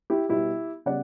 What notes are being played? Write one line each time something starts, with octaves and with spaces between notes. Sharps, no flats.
E4 G4
B2 G3 B3 E4 G4
C#3 G3 B3 D5 F#5